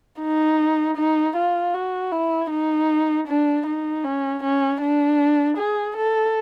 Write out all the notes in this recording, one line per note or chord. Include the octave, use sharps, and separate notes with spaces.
D#4
D#4
F4
F#4
E4
D#4
D4
D#4
C#4
C#4
D4
G#4
A4